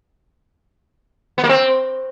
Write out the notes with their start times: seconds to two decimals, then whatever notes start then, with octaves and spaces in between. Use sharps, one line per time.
1.38 B3
1.44 A#3
1.49 C4